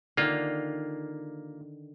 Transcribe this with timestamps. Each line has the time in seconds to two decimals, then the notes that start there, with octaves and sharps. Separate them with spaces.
0.17 D3 D#3 A#3 F4